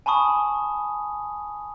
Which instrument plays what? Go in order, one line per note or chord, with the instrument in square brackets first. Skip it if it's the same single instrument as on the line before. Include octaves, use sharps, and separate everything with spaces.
[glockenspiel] G#5 A5 B5 C#6 D#6